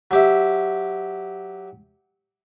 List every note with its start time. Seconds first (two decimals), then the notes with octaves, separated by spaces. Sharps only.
0.11 F#3 G4 E5